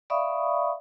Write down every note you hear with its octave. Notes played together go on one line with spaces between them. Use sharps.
D5 E5 F5 B5 C#6 D#6